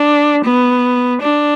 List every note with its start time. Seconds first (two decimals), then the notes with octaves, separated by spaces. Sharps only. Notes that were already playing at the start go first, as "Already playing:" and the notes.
Already playing: D4
0.44 B3
1.21 D4